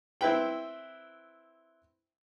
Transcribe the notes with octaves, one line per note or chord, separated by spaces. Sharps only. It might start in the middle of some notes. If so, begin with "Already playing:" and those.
C4 E4 B4 G5